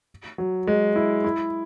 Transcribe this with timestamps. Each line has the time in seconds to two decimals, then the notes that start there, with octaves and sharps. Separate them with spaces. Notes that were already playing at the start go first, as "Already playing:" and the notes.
0.38 F#3
0.67 G#3
0.96 E4
1.24 E4